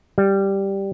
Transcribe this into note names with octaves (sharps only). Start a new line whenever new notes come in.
G3